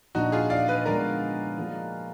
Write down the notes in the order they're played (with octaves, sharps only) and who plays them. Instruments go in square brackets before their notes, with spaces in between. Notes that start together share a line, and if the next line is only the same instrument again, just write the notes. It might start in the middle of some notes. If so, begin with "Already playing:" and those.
[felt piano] A#2 F3 A#3 D4 [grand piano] D#4 F#4
[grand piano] F4 G#4
D5 F5
B4 D#5
[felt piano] D3 F3 G#3 B3 [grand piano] A#4 D5
[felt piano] F3 A#3 F4 G#4